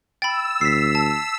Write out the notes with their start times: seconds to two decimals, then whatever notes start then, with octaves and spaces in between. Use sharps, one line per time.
0.22 G5 B5 E6 A6
0.61 D2 B6 C7
0.95 A5